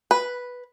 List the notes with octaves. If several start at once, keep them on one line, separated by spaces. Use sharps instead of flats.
B4